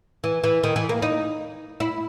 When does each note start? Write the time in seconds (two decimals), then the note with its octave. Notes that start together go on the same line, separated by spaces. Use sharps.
0.24 E3
0.44 E3
0.63 D#3
0.76 E3
0.89 A#3
1.02 D#4
1.80 E4